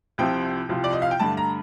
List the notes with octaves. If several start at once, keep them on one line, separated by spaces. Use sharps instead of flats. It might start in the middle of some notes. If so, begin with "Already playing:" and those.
C2 C3 F3 C4 F4 G5
C2 C3 F3 C4 F4
D5
D#5
F5
G5
G2 D3 A3 A5
A#5